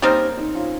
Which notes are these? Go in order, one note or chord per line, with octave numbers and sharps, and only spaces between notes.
G3 A#3 C4 C#4 D#4 A#4
C4 D#4
C#4 F4